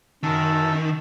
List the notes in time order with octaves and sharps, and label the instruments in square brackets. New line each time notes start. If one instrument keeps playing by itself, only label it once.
[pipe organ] F#2 A5 E6 [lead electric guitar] D#3